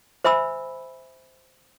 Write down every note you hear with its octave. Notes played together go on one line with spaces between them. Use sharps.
C5 E5 G#5 B5 E6